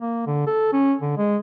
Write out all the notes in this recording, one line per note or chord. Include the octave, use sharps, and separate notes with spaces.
A#3
D3
A4
C#4
D3
G#3